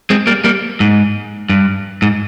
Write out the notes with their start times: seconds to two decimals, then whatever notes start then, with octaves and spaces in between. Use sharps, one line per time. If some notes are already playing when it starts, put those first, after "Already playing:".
0.10 G#3 C4
0.27 G3 A#3
0.44 G3 A#3
0.80 G#2
1.49 G2
2.02 G#2